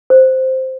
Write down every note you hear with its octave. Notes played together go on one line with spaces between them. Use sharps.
C5